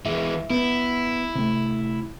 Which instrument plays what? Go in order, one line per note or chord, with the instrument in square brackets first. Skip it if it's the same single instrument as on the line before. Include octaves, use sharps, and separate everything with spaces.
[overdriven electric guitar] E3 G#3 [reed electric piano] E5
[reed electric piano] B3 [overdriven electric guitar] E4
[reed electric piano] C3 A3